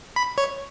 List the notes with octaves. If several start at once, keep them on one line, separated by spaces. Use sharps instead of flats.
B5
C#5